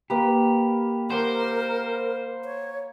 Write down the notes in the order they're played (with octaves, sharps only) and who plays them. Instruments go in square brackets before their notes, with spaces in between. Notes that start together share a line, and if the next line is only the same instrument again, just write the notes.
[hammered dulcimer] A#3 B4 [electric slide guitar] G4
[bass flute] A#4 [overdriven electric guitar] C5 [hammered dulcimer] F#5 D6
[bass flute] C#5